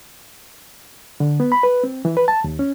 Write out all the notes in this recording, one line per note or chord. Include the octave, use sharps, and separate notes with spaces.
D3
B3
B5
B4
C4
E3
B4
A5
D#2
C#4